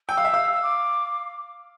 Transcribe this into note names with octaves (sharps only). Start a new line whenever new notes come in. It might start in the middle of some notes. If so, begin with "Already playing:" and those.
G5 E6
F5
E5
F5
E6
D6